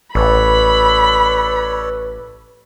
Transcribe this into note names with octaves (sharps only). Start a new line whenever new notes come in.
A1 A4 B4 C#5 D5 B5